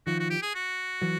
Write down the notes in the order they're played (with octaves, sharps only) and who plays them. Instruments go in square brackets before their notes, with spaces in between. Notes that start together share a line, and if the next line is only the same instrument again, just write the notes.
[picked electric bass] D#3 F3 [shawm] F#4
[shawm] F#4
G4
G#4
F#4
[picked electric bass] E3 F#3